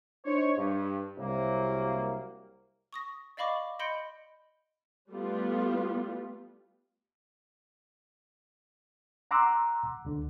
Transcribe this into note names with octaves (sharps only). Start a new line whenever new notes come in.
D4 D#4 C5 C#5
G2
C2 F#3 A#3
C#6 D#6 A#6
D5 D#5 F5 B5 C#6 D6
D#5 B5 C6 G6 C#7 D7
G3 A3 B3 F4
F#5 A#5 C6 D6 E6 F#6
D2 D3